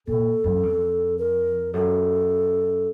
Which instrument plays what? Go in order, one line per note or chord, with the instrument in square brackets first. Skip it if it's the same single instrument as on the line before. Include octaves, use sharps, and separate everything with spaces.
[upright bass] A#2 [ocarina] A4
[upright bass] F#2
F2
[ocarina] A#4
[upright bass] F#2 [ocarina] A4